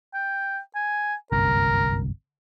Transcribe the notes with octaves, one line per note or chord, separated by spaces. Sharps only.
G5
G#5
G1 C2 F#2 A#4